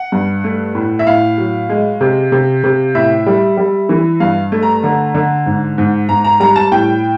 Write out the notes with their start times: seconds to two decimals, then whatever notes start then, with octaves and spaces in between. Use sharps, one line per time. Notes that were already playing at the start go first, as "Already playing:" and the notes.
Already playing: F#5
0.12 G2
0.44 A3
0.75 A2
0.99 E5
1.07 A2 F5
1.38 F#3
1.69 G#3
2.01 C3
2.32 C3
2.64 C3
2.95 A2 E5
3.26 G3
3.57 G3
3.89 E3
4.20 G2 F5
4.52 A3
4.63 A#5
4.83 D3
5.15 D3
5.46 G#2
5.78 G#2
6.09 G#2 A#5
6.24 A#5
6.40 G3 A#5
6.56 A5
6.72 A2 G5